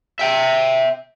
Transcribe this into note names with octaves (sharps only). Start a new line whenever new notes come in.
E5 G5